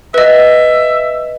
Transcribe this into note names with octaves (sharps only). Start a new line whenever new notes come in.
B4 D#5 E5